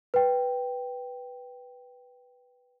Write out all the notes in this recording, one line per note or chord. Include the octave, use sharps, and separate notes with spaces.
B4 G5